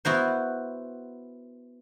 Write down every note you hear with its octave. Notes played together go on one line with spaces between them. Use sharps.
B3 E4 F#4 C5